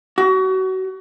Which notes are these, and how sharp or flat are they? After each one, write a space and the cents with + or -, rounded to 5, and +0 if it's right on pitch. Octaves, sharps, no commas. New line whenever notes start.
F#4 +30